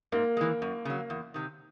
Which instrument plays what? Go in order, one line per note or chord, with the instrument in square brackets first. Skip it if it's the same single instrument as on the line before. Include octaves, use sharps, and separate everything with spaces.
[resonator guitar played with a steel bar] G#2 [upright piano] A#3
[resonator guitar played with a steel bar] E3 G#3
F#2
C#3 F#3
E2
C3 D#3